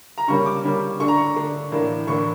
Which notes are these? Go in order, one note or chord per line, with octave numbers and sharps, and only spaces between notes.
A#5
C#3 G3 A#3 C#4 C#6
D6
C#3 G3 A#3 C#4
D3 A3 D4 C#6
A#5
C#6
D3 A3 D4
A2 E3 A#3 D4
A2 E3 A#3 D4 C#6